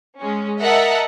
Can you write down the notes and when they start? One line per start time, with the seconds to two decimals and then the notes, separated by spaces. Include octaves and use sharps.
0.20 G#3 C#4
0.62 A#4 D#5 E5 F#5 A5 A#5